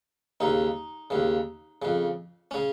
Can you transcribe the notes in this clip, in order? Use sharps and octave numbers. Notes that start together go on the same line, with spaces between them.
D#2 C#3 D#4
D#2 C#3
F2 C#3
C#3 C#4